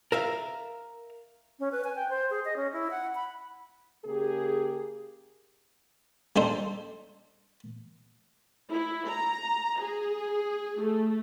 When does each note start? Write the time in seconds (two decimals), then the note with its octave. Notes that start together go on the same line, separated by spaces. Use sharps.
0.12 A#4 E5 F5
1.60 C#4
1.72 B4
1.84 G#5
1.96 G5
2.09 C5
2.30 G#4
2.45 D#5
2.56 C#4
2.73 E4
2.91 F#5
3.15 B5
4.05 C#3 A#3 G4 G#4
6.36 G3 D4 D#4 A4 C5
8.70 E4
9.07 A#5
9.80 G#4
10.80 A3